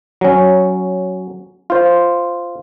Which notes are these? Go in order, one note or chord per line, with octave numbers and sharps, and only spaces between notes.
F#3 C#4
F4 C5